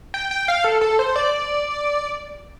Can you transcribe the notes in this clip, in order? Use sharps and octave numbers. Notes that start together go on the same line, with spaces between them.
G5
G5
F5
A4
A4
C5
D5